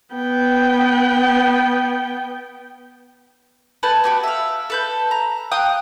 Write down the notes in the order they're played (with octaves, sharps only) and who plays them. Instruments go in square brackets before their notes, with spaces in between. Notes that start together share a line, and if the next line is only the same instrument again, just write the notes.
[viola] B3 G5
[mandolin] A3 B4 G#5 A5
B3 F#4 G4
E5 F5
A4 B4 G6
A#5
F5 G5 D#6 F#6